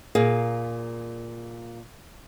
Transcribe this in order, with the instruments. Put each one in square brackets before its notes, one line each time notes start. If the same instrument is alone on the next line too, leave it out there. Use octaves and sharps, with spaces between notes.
[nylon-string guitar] A#2 G#4 A#4 F5